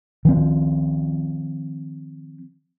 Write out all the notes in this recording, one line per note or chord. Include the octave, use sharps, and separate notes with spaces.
D#3 F3 C4